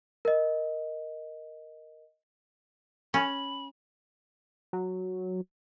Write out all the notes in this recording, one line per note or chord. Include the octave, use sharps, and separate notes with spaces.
A#4 D#5
C#4 B5
F#3